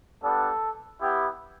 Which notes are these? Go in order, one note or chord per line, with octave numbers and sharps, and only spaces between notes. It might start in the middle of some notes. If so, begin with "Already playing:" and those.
G3 B3 D4 A4
B3 E4 G4